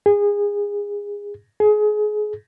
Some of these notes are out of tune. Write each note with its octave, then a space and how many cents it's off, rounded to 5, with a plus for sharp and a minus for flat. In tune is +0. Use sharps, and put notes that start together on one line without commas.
G#4 -25
G#4 +25